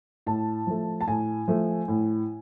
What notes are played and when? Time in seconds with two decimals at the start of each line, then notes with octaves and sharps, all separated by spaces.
0.26 A2 A5
0.67 F3 A3
1.01 A5
1.07 A2 G#5
1.48 F3 A3
1.88 A2